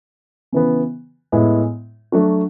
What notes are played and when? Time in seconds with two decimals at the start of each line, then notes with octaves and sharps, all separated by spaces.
0.52 C#3 E3 B3
1.32 A2 G#3 B3 E4
2.12 F#3 A3 D4 F#4